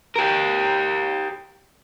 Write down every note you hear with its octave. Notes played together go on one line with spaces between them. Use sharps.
G4 A#4